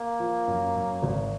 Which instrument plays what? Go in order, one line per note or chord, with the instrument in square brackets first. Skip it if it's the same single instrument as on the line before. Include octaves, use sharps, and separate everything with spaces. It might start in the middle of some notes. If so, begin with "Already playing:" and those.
Already playing: [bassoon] A#3
[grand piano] F3
F#2
F#2
G#1